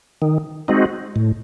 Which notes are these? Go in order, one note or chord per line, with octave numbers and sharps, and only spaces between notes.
D#3
G#3 C4 D#4 F#4
A2